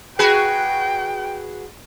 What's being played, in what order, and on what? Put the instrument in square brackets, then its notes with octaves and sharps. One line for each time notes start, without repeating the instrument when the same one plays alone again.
[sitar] F#4 G#4 B4 [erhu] G5